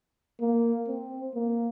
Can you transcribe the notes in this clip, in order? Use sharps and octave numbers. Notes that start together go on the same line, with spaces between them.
A#3
C4
A#3